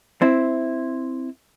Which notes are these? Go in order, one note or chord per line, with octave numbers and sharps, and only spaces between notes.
C4 E4